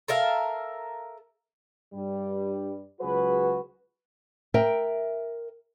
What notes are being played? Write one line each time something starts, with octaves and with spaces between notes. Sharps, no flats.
A4 A#4 E5 F5
G2 G3
C#2 F#3 F#4 G#4 B4
A#4 E5 G5